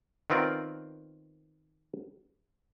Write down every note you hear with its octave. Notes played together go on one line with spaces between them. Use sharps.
D#3 B3 C4 F4 A#4 D5